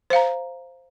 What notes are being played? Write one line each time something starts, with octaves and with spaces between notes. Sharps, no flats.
C5 F5 A#5